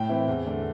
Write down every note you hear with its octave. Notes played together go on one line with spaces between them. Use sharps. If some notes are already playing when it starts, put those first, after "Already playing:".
Already playing: A2 G5
E3 C4 E4
E2
D3 A3 D4